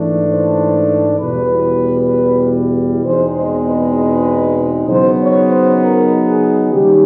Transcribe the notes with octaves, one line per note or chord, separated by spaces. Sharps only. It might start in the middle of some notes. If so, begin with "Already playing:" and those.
Already playing: G#2 E3 A3 D4
C5
E2 B2 G3 B4
E2 B2 G#3 C4 D#4 C5
C5
B4
B4
C#3 F#3 B3 D#4 C5
C#5
C5
A#4
G#4
D#3 G3 A#3 C#4 G4